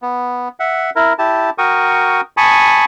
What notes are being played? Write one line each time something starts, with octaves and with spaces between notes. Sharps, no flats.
B3
E5 F#5
E4 A#4
E4 G4 A5
F#4 A#4 G5 C#6 D#6
G#5 A5 B5 C#6 D#6